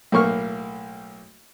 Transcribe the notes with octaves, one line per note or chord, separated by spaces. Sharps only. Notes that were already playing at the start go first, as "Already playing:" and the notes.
B1 A2 A#3 C#6 F6